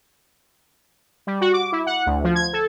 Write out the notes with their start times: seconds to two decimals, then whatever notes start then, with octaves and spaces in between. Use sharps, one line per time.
1.27 G3
1.41 F#4
1.53 D6
1.72 E4
1.86 F#5
2.06 D2
2.24 F3
2.35 G#6
2.53 A4